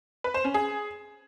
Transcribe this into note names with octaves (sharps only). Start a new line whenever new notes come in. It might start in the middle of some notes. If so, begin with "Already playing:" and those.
B4
C5
C#4
G#4